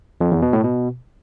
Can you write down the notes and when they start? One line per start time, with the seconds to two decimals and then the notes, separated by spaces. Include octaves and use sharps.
0.21 F2
0.31 E2
0.42 B2
0.53 A2
0.64 B2